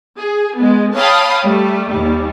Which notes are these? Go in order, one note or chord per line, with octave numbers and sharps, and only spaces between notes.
G#4
G#3 B3
C#5 F5 G5 A5 B5 D#6
G3 A3
D#2 G3